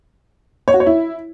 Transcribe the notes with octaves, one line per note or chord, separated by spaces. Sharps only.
C#5
F#4
C#5
E4